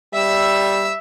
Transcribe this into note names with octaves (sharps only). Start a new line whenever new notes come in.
G3 E5 E6